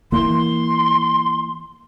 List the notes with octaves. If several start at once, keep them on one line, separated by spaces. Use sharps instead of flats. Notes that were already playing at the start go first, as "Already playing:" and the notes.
E3 A#3 C6